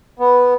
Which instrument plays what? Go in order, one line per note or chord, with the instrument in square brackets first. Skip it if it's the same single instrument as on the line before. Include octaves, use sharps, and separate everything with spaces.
[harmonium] B3